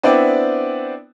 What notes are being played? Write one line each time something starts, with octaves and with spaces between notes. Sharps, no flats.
B3 C4 D4 E4 D5 G5